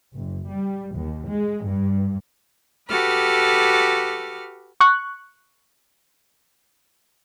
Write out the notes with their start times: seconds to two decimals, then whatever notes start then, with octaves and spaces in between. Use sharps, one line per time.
0.16 F#1
0.49 G3
0.96 D#2
1.28 G#3
1.66 G2
2.90 F#4 G4 A4 B4 D6 F6
4.80 C#6 F#6